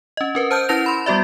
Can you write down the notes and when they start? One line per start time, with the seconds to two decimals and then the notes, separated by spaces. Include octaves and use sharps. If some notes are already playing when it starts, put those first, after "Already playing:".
0.17 C#4 D#5
0.35 C#4 A#4 B4
0.51 C5 A5 F6 G6
0.69 C#4 E4 B4 A5 A#6 F7
0.86 B5 C6
1.06 G3 B3 F#4 D5 E5